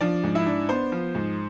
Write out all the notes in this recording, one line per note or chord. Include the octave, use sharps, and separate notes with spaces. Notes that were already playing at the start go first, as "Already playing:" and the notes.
F3 D4 D5
G#2
E4 E5
D4
B3 C5 C6
F3
G#2